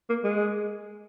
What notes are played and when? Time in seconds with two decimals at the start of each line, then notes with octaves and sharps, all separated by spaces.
0.09 A#3
0.23 G#3